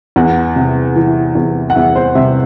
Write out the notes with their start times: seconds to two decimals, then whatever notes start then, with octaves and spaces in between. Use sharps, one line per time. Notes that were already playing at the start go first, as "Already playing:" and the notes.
0.16 E2 F#5
0.56 C3
0.96 E3
1.35 E2
1.70 F#5
1.75 E2 E5
1.95 C5
2.15 C3 E5